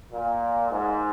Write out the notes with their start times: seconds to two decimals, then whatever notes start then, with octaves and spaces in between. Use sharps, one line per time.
0.11 A#2
0.71 G#2